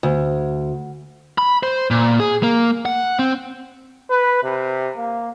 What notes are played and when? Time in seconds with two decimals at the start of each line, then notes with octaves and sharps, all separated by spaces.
0.03 D2
1.38 B5
1.63 C5
1.91 A#2
2.20 G#4
2.43 A#3
2.86 F#5
3.19 C4
4.10 B4
4.44 C3
4.97 A#3